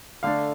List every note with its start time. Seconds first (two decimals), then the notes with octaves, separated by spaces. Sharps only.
0.23 D3 A3 D4 F5